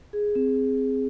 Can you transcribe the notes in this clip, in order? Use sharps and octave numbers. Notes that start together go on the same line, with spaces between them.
G#4
C4